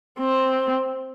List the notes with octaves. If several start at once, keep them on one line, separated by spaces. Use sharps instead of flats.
C4